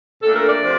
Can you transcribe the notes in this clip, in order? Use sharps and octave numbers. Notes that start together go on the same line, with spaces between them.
A#2 A3 D4 A4
A#4
D5
C3 F3